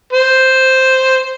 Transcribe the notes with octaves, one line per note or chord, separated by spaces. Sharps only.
C5